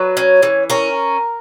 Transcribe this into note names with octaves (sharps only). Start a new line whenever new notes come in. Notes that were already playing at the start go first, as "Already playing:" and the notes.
Already playing: F#3 B4
C#4
E3
C#4 A#4